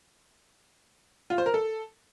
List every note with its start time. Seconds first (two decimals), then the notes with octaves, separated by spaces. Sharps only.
1.30 F4
1.38 C5
1.46 A#4
1.54 A4